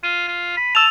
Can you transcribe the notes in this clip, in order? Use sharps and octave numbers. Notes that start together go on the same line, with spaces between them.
F4 D#7
F4
B5
A5 E6 A6 F7